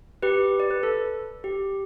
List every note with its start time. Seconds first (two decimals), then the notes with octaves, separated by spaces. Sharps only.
0.22 G4 B4
0.60 D5
0.71 B4
0.83 A4
1.44 G4